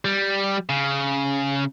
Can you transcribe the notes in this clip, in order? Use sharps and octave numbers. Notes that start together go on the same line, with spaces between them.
G3
C#3